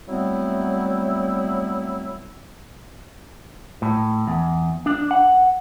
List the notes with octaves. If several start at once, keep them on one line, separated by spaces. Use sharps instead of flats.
F#3 G3 A3 B3 C4 E4
A2
E2
D4
F#5